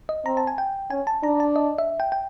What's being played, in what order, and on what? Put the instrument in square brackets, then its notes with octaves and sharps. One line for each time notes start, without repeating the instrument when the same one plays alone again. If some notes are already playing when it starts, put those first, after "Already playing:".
[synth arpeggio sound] D#5
[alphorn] C4 [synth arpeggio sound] A#5
[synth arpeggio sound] A5
G#5
G5
[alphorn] C#4 [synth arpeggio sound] G#5
[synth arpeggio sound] A5
[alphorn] D4 [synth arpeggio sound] A#5
[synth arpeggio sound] A5
D#5
E5
G5
G5